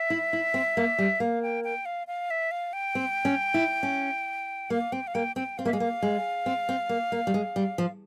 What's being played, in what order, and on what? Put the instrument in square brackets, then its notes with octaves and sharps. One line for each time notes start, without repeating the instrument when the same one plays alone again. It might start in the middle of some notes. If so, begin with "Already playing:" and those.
Already playing: [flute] E5
[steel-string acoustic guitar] E4
E4
C4
A#3
G3
[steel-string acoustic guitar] A#3 [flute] F5
[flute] G5
G5
F5
F5
E5
F5
G5
[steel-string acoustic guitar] C4
C#4
E4
C#4
[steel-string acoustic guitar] A#3 [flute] F5
[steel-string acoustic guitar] C4 [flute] G5
[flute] F5
[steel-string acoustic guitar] A#3 [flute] G5
[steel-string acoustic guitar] C4 [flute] G5
[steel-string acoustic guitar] C4 [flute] F5
[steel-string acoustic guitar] A#3 [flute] E5
[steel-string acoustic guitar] G#3 [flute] F5
[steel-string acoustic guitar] A#3
G#3
C4
C4
A#3
A#3
G3
G#3
G3
F3